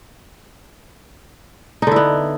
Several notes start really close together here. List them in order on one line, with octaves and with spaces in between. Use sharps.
D#4 D3 E4 B3